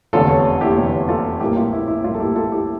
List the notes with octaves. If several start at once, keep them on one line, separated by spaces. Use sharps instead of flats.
F1 E2 D3 F4 A4
A4 C#5
E4 G4
F1 E2 D3
F4 A4
A#1 A2 G3 A#3 E4 G4
F4
E4
E4
A#1 A2 G3 A#3 F4
A4
E4 G4
F4 A4
E4 G4